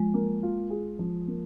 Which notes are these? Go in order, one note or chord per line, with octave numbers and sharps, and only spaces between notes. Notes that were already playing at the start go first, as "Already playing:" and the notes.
Already playing: F3 G#3
A#3
F4
G#4
F3
A#3